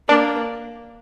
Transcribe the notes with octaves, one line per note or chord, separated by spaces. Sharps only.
A#3 D4